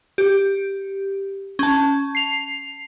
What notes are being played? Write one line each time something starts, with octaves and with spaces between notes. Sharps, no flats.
G4
C#4 A5
C7 F7